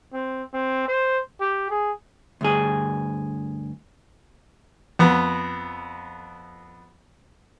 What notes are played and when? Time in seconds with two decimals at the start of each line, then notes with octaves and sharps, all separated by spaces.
0.14 C4
0.54 C4
0.88 C5
1.41 G4
1.70 G#4
2.41 D2 G2 G#4
4.99 F2 B3